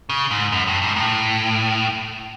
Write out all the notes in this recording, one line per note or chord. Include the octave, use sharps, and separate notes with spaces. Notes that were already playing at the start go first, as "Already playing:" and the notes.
C#3
G#2
F#2
G2
G#2
A2